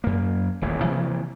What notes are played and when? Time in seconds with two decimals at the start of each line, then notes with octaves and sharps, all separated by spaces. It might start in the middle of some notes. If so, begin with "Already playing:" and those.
0.04 F#2 A#3
0.62 D#1 A1 E2 A#2
0.83 C3 E3 F3 A#3